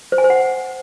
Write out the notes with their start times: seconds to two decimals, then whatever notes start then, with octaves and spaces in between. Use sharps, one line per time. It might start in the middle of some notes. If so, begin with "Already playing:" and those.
0.12 C5
0.18 G#5
0.24 C5
0.30 F#5